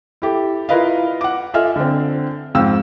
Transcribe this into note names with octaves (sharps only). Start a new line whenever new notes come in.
E4 G4 A4
E4 F4 A#4 B4 D#5 F5
F#5 D6
F4 A4 D#5 E5 G#5 F6
D3 C4
F2 G#2 F5 G5 E6